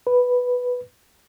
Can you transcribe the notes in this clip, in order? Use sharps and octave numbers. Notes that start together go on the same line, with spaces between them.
B4